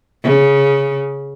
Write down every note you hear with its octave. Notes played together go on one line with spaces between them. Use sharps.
C#3